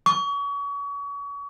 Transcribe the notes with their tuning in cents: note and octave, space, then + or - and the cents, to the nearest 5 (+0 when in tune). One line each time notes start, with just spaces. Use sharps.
C#6 +35